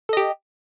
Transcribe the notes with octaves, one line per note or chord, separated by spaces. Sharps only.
G4 A4 D#5